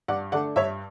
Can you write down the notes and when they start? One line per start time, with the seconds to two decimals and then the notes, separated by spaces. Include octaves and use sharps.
0.08 G2 D5 F#5
0.32 D3 A3 D4 D5 F#5
0.56 G2 C#5 E5